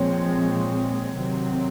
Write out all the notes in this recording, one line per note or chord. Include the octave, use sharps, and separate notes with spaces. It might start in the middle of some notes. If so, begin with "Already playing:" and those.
Already playing: A#2 F3 G#3 C4 C#5
C3 D#3 F#3 C4